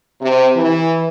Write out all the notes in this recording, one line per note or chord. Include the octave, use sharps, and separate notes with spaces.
C3
E3